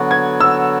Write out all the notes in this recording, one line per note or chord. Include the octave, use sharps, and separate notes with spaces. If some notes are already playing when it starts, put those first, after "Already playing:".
Already playing: D3 F#3 B3 F#4
G#6
E6